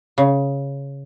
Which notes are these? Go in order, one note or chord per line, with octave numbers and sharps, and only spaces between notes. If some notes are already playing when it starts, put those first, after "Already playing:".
C#3